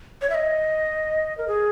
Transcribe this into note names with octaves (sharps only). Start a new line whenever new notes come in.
C#5
E5
D#5
A#4
G#4